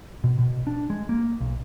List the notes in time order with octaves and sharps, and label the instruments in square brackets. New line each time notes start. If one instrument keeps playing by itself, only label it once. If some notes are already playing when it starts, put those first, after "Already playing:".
[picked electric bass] B2
B2
D4
G#3
A#3
B1